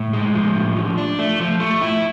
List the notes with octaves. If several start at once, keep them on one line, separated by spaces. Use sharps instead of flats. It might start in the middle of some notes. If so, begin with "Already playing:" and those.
Already playing: A2
G#3
F3
A2
F3
D4
A3
F3
A3
E4